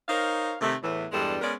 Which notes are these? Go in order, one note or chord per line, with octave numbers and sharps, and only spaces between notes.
D#4 A#4 C5 C#5 F5
C3 D#3 A3
E2 A2 E3
E2 G2 G3 G#3 D4 A4
G#3 B3 C#4 A#4 D5